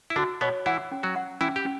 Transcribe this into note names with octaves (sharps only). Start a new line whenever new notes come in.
E4
D3 D4 F#4
B2 B3 C#5
E3 E4 F#5
C#4
F#3 F#4
F#5
E3 C#4 E4
G4
C#4